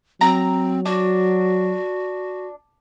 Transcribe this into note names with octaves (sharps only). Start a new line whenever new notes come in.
F#3 C4 A#5
D4 F#4